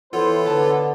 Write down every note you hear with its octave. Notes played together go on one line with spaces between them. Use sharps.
E3 B3 E4 F4 A4 C5 C#5
D3 B4 A5